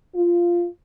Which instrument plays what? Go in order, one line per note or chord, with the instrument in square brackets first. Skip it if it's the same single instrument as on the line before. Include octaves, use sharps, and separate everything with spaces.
[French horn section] F4